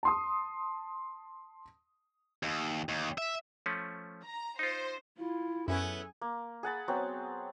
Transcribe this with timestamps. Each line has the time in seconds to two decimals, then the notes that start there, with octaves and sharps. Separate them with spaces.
0.03 A5 C6 D#6
2.43 D#2
2.89 D#2
3.18 E5
3.66 F3 A3 C#4
4.23 A#5
4.59 D#4 F4 C5
5.17 E4 F4
5.68 F#2 B3 C#4 E4 G#4 A4 G#5
6.21 A#3
6.63 G#4 F#5 A5 B5
6.88 F#3 B3 C4